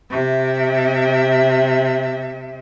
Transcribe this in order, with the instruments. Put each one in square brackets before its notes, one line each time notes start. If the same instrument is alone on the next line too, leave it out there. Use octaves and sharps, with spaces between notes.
[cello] C3 E5